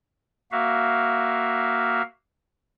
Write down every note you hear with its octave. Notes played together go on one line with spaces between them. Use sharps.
A#3 F#4 E5 F5